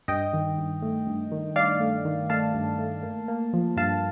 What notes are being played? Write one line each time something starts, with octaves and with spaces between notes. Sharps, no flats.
G2 D#5 G5
D#3
G2
A3
G2
D#3
G2 D5 F5
A3
D#3
A3 F5 A5
G2
A3
A#3
A#3
F3
G2 F5 A5